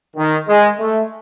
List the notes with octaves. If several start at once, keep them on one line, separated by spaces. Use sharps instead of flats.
D#3
G#3
A3